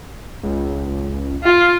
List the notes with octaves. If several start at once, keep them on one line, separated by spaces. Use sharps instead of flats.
C#2
F4